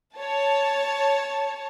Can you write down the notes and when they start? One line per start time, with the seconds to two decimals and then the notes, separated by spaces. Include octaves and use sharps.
0.18 C#5 A5